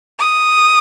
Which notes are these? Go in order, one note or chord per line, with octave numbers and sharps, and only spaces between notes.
D#6